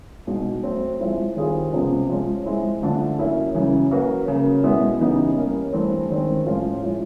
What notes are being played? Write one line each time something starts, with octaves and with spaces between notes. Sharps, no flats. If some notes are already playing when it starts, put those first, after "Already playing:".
C2 B2 G#3 B3 D#4
F#3 A3 C4
F3 G#3 C4 E4
D#3 G3 C4 F4 G#4
C#2 C3 F3 G#3 B3
F3 G#3 C#4
G#3 C4 E4
D3 F3 A3 D4
F#3 A#3 C#4 E4
F#2 C#3 E3
F#3 A#3 C#4 F#4 B4
C#3 F#3 A#3
B2 G#3 B3 E4
C#3 E3 G3 B3 D#4
G3 A#3 C#4
G2 E3 A3 C4
F#2 D#3 G#3 C4
A2 F3 G#3 C#4 F4
F3 G#3 C#4 E4